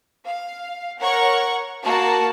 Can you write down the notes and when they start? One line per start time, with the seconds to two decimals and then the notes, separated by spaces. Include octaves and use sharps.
0.25 F5
0.99 A#4 C#5 F#5 C#6
1.83 A#3 F#4 A5